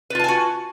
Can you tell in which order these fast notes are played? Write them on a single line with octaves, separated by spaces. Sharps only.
B4 F4 A5 G#5 F#4